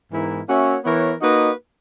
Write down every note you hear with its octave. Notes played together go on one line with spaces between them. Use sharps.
G#2 E3 B3 E4 A#4
A#3 C#4 F#4 C#5 E5
E3 B3 E4 A#4 C#5
A#3 D#4 F#4 B4 D#5